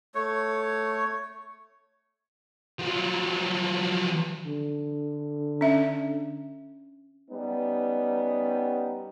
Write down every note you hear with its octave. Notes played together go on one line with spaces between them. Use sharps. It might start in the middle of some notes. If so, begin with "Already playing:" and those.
A3 C#5
F3 F#3
D3
C#4 E5
G3 B3 C#4 D#4